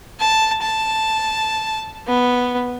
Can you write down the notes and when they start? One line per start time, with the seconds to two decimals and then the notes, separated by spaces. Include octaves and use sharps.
0.20 A5
0.62 A5
2.07 B3